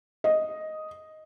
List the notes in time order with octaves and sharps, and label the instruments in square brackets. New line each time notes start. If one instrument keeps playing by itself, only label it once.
[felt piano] D#5